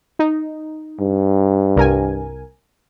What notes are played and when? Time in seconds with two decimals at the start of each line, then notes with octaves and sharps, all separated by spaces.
0.19 D#4
1.00 G2
1.76 C2 A#4 G#5